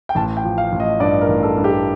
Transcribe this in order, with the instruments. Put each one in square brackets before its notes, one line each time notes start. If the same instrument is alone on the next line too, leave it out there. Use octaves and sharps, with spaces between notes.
[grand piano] G5
A1 A5
G5
F3
F5
A1
D#5
G2 D5
A#4
A1
A4
G2
G4